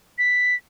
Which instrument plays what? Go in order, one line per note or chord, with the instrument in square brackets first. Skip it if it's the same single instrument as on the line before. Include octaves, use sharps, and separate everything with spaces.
[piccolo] B6